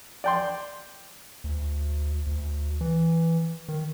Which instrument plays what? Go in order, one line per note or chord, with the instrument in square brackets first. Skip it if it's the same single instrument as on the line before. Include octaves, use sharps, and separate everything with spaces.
[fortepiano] D5 G5 C6
[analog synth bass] D2
D2
E3
D#3